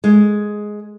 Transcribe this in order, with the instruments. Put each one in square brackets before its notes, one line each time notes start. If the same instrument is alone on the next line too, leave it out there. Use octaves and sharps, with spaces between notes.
[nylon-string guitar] G#3